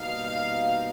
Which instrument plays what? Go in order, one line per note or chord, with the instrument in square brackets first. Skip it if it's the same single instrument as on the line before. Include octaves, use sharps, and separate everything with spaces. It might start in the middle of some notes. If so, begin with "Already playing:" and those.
Already playing: [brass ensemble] B2 G3 A#3 D#4 [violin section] F5